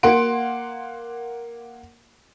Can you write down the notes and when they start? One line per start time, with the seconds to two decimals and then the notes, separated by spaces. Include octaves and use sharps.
0.03 A#3 F#5 C6 D7